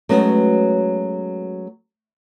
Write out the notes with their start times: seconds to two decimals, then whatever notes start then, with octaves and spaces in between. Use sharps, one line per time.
0.09 F#3 G#3 A3 B3 C#4 F#4